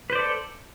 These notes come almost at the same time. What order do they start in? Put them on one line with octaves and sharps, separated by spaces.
B4 C5 D5 A4